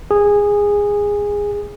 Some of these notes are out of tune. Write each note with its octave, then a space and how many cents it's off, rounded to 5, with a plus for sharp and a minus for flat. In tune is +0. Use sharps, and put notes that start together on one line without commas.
G#4 -15